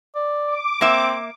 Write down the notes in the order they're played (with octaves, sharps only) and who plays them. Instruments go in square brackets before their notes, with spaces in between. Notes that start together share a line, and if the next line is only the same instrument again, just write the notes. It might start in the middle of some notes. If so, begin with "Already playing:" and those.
[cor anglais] D5
[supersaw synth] D6
[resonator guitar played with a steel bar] A#3 E5 [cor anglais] C4